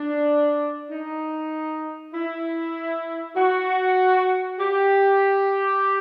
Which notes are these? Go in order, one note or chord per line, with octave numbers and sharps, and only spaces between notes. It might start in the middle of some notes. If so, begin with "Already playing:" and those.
Already playing: D4
D#4
E4
F#4
G4